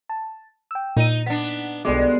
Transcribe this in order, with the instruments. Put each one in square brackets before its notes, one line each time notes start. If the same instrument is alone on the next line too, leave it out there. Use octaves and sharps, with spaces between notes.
[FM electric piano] A5
G5 E6
[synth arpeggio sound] A#2 D#7 [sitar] D#4
[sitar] B3 D4 [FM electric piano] B6
[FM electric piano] B1 D6 [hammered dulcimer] B2 D3 G3 [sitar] G#3